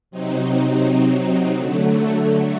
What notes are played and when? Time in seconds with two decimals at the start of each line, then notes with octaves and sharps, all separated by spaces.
0.11 C3 F#3 C4 D#4
1.55 D3 F#3 A3